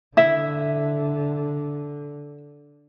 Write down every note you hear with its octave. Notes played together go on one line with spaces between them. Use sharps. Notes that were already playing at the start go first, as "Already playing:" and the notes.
D3 E4 E5